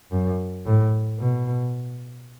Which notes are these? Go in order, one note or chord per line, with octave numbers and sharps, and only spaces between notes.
F#2
A2
B2